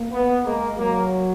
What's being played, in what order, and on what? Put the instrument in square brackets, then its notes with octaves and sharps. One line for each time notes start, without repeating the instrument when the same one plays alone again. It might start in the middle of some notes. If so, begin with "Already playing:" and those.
Already playing: [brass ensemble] A#3
[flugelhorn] B3
[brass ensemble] G#3 [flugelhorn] A#3
[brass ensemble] F#3 [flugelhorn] A#3